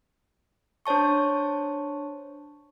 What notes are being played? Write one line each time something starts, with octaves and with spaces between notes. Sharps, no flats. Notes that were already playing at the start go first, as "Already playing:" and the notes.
D4 C5 C#5 A5 C#6